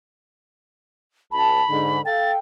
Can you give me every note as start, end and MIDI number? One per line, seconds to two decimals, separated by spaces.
1.32 1.61 37
1.32 1.61 81
1.32 2.02 83
1.70 1.99 44
1.70 1.99 50
2.06 2.38 69
2.06 2.38 77
2.06 2.38 79
2.06 2.31 93